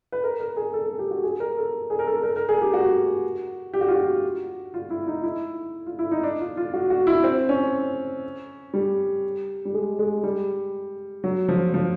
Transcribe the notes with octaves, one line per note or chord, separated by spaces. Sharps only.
B4
A#4
A#4
G#4
A4
G#4
G4
F#4
G#4
A#4
A4
G#4
A#4
A4
A#4
A#4
G#4
G4
F#4
G4
F#4
F4
F#4
F4
E4
D#4
E4
F4
E4
D#4
D4
F4
F4
F#4
F#4
E4
C4
C#4
G3
G3
G#3
G#3
G3
F#3
F3
F3